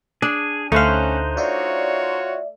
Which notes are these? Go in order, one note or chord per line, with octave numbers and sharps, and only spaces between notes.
D4 G#4
D2 A3 C#4 D#4 C5 F5 F#6
F4 F#4 C#5 D5 E5